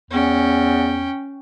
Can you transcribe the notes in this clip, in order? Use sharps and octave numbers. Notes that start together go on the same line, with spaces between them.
E2 C#4 G5